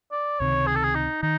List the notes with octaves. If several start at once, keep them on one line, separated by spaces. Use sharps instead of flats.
D5
C#2 C3 D#3 C#5
G#4
A4
G#4
D#4
D#3 D#4